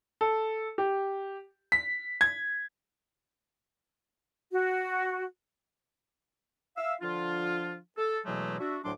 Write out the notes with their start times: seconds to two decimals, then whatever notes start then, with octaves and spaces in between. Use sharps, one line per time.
0.21 A4
0.78 G4
1.72 B6
2.21 G#6
4.52 F#4
6.77 E5 F5 E6
7.01 D3 F3 D4 F4
7.98 A4
8.25 E2 B2 E3 F#3 G#3 A3
8.59 D4 F#4 E5
8.84 D2 A2 F#3 D4 C6 D6